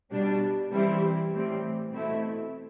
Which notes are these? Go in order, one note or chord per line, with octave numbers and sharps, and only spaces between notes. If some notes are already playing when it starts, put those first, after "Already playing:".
B2 G3 D4
E3 G3 C4 E4
A2 E3 G3 C4
B2 A3 C4 E4